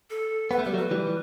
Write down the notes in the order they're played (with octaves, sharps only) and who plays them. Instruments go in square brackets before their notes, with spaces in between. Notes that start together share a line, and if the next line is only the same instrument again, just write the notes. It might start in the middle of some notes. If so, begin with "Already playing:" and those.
[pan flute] A4
[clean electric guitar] B3 [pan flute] B4
[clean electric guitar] A3
[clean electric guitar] G3 [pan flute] A4
[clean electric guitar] F#3 A3
[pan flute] B4
[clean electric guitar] E3 G3